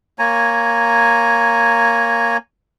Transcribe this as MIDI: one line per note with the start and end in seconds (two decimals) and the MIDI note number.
0.19 2.37 58
0.19 2.37 73
0.19 2.37 80
0.19 2.37 82